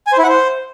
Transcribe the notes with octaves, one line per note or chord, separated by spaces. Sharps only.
G#5
C5
E4
F#5
C5